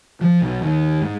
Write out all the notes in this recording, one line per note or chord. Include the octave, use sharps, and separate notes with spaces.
F3
B1
D#2
G#2